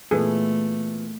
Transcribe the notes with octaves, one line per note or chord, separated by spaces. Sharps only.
A#2 E3 A3 B3 G#4 A4